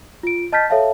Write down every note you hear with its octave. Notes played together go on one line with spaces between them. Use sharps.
F4 D7
D#5 A5 F6 G6 A6 B6
A4 C#5 E5 F5 A5